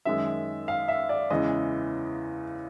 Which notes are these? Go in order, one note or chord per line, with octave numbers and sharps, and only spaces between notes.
F#2 D#3 G#3 E5
F5
E5
D5
E2 C#3 E3 G#3 D#5